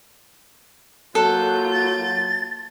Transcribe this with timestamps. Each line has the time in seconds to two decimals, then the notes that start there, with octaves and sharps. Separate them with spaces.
1.15 F#3 A#3 F4 A4 F#6 G6
1.73 A6